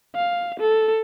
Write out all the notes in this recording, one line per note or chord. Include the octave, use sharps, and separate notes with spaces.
F5
A4